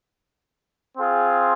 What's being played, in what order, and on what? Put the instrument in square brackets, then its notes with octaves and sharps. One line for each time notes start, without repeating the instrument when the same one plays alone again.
[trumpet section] C4 F4 G#4